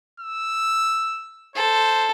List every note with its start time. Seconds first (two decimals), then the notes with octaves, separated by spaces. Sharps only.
0.20 E6
1.55 A4 C5